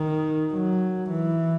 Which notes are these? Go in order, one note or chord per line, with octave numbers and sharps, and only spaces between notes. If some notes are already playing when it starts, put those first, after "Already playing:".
Already playing: D#3
F#3
E3